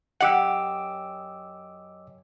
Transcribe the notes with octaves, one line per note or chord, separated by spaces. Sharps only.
F#2 G4 D#5 F#5 D6 E6